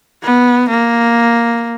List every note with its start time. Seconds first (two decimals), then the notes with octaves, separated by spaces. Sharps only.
0.24 B3
0.70 A#3